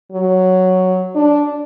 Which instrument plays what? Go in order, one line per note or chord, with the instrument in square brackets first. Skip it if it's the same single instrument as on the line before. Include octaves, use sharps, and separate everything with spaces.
[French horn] F#3
D4